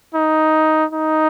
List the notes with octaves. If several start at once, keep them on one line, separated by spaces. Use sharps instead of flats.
D#4
D#4